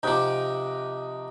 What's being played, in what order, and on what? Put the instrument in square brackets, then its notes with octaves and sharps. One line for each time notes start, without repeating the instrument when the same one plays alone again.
[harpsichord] C3 F3 [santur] D#4 F#5 D6